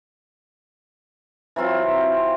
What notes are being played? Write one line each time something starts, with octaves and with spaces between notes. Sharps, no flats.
E3 F#3 C4 F4